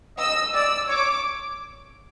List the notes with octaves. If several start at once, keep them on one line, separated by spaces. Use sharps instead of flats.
D#5 E6
D5 E6
C#5 D6